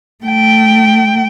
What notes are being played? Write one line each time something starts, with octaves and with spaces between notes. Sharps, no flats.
A3 G5